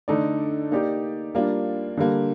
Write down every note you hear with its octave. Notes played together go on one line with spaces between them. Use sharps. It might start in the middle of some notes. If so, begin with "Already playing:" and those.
D3 A3 D#4 A4 D5
A#3 D#4 G4 D5
G3 A#3 D4 F4
D3 G3 A#3